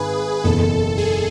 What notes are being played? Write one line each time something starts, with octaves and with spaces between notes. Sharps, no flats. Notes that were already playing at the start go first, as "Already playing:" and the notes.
Already playing: G#1 G#2 G#4 B4
F#1 E2 B2 A4
G#4